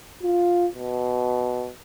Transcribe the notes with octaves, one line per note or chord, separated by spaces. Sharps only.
F4
B2